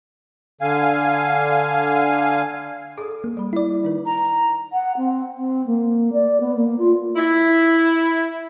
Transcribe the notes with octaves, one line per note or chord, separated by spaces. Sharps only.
D3 F5 G#5
G#4 A4
A#3
G3 B5
E4 D5
D#3 D#4 B4
A#5
F#5
C4
C4
A#3
D5
B3
A#3
F4
E4